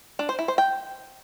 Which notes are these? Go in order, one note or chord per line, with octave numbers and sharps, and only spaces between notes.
D4
C5
E4
C5
G5